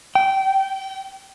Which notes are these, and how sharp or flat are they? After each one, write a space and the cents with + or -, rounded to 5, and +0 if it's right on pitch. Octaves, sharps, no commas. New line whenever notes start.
G5 -20